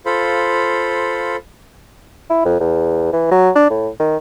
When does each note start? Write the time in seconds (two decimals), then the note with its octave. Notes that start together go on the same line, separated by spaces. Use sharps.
0.06 F4 A4 C5 F5 B5
2.30 E4
2.45 F2
2.60 E2
3.13 E3
3.31 F#3
3.56 D4
3.70 A2
4.00 D#3